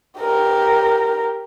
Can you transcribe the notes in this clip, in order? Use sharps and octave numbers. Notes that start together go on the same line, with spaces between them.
G4 A#4